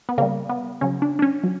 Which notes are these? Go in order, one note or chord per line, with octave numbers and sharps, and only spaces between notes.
B3
C#3 G3 A#3
B3
C#3 F#3 C#4
D4
D4
C#4
F#3